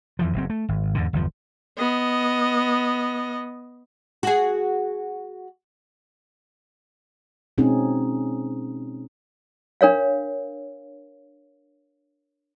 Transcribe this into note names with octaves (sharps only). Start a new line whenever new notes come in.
F2 E3 F3
F#1 F#2 C4
A3
G#1
E2 G#2 D3
G1 E2 F3
B3 D#5
F#4 G#4
B2 G#3 C4 C#4 D#4 G#4
D4 A#4 C#5 F5